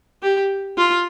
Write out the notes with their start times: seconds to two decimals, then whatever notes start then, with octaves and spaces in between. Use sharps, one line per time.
0.22 G4
0.78 F4